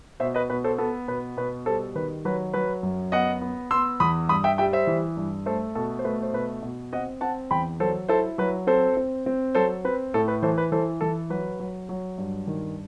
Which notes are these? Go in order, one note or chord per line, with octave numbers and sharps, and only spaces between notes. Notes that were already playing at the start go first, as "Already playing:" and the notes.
B2 C5 E5
B4 D#5
B2 B4
A4 C5
B3 A4
B2 B4
B2 B4
G3 A4 C5
D#3 B4
F#3 B4
F#3 B4
F#2
B3 D#5 F#5
B3
B3 C6 E6
E2 B5 D#6
G2 B5 D#6
E5 G5
G3 E5 G5
C5 E5
E3
G2
A3 A4 C5
B2 A4
C5
A3 B4
C5
B2 B4
B2
C4 D#5 F#5
C4 F#5 A5
E2 G5 B5
F#3 A4 C5
E4 A4 C5
F#3 B4
C4 A4 C5
C4
C4
F#3 A4 C5
C4 B4
A2 A4
B4
E3 A4 C5
B4
E3 A4 C5
E3 A4
F#3 B4
F#3
F#3
G2
D#3